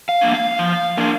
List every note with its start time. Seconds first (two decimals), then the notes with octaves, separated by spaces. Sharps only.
0.09 F5
0.21 A#3 D4
0.34 F5
0.59 F3
0.97 A#3 D4